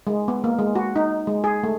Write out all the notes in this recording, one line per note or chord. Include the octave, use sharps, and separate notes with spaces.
G#3
B3
A#3
G#3
F#4
D#4
G#3
G#4
A3